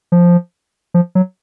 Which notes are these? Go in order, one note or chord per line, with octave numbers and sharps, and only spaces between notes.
F3
F3
F#3